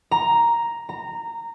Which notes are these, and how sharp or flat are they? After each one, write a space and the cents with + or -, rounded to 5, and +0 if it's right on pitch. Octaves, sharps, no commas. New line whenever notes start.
A#5 +5
A#5 -15